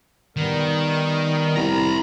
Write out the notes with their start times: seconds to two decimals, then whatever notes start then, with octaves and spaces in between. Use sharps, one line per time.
0.37 D#3 G3 B3 A#4
1.56 C2 A#5 B5